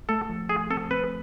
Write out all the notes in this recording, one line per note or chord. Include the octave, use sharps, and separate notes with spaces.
A3 A4
F3
A3 G#4
C4 A4
C4 B4